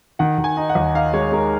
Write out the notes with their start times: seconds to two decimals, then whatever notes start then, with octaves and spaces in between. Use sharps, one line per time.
0.19 D#3 F#5
0.38 D#3
0.44 G#5
0.57 D#4
0.69 F#5
0.75 D#2
0.95 D#4 F5
1.13 G#3 C#5
1.32 G#3 A#4